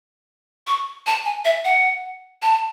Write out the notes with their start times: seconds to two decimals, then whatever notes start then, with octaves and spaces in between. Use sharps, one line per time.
0.67 C#6
1.07 A5
1.25 G#5
1.45 E5
1.65 F#5
2.42 A5